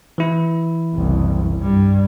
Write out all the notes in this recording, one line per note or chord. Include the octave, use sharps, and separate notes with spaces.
E3 E4
F#1 C2
G2 G3